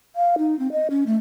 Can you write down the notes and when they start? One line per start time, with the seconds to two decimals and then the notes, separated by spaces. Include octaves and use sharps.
0.16 F5
0.38 D#4
0.59 C4
0.72 D#5
0.90 C#4
1.07 A3